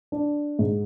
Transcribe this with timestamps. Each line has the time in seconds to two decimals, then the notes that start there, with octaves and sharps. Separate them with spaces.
0.12 D4
0.59 G#2